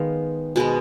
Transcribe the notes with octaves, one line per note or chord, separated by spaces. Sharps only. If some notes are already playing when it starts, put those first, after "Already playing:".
Already playing: D#3 G#3 B3 F5
B2 G#3 B3